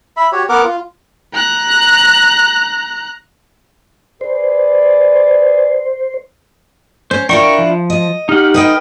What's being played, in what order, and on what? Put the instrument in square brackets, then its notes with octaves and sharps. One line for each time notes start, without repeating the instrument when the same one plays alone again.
[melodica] E5 B5
F#4 G4 C#5
B3 A#4 F#5 D6
F4
[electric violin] A#5 F#6
[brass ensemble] G#4 B4 D5 [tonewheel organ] C5
[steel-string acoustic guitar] C#4 [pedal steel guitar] C5
[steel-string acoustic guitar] D4 E4 F4 [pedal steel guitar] A#4 G5 C#6
[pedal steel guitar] F3
[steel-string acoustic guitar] D#5
[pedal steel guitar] D#4 F#5 [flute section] G4 F6
[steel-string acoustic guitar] B4 D#5 G5 [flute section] D#6 F6